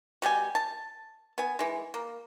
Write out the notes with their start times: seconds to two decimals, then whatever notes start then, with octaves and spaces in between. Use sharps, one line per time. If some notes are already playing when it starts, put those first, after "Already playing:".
0.22 B2 G3 G4 G#5
0.55 A5
1.38 B3 G#5
1.59 E3 G#3
1.94 A#3